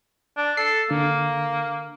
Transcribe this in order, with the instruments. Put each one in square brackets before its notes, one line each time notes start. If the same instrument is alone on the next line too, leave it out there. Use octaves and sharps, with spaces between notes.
[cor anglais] D4
[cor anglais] A4 [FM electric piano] C7
[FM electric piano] D3 [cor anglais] A#3